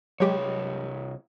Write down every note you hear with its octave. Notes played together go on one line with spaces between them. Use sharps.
C2 F#3 G#3 G4 C#5